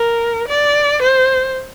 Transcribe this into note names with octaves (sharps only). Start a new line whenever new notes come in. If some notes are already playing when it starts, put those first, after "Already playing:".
Already playing: A#4
D5
C5